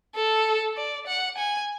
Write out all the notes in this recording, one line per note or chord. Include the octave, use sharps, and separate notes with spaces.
A4
D5
F#5
G#5